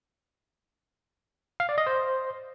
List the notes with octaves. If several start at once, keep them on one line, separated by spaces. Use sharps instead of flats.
F5
D5
D#5
C5